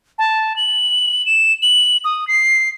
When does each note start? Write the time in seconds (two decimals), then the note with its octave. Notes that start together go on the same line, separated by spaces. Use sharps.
0.18 A5
0.56 F#7
1.26 E7
1.62 F#7
2.04 D#6
2.27 C7